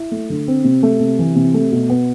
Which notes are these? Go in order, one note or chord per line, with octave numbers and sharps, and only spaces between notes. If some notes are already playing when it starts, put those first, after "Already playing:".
Already playing: E4
A3
D3
C4
C3
A3
C3
E3
C3
A3
B2
B3